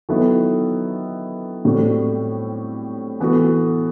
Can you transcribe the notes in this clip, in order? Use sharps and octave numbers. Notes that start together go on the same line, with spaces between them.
D#3 F#3 B3 E4 A4
A2 G3 C4 F#4 A4
E3 B3 F#4 A4